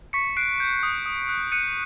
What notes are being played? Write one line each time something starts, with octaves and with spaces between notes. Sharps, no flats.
C#6 B6 C#7
F#6 C7 D7
G6
D#6
D#6
F#6
F#6 C#7 D#7